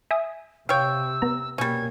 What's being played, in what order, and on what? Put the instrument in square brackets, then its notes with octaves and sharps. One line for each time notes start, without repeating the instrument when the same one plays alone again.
[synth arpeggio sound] E5 G#5 D#6
[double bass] C3 [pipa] C#5 G5 [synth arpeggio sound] F5 [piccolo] E6
[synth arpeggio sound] B3 A#5
[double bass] B2 A#3 [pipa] G3 C#4 [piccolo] G#6